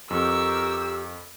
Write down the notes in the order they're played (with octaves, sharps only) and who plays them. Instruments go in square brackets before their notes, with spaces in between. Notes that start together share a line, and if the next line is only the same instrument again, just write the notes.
[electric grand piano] F2 [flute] G4 [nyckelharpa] A#4 C#6 [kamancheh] E6